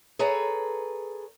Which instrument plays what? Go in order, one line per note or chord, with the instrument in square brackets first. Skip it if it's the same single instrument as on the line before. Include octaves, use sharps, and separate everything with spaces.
[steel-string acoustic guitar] G#4 A4 B4 C#5 A#5